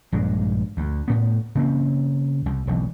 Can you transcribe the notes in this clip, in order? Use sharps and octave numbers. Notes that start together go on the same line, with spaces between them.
A#1 G2 G#3 D4
D2
A2 B3
C#3 A#3 C4
C2
E1 B1